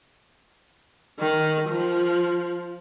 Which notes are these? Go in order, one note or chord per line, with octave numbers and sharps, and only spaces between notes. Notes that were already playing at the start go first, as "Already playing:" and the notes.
D#3
F3